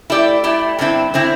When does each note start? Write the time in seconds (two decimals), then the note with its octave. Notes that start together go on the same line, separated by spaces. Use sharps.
0.10 A3 E4 G4 D5
0.44 A3 E4 G4 D5
0.78 G2 D3 C4 E4
1.14 D3 C4 E4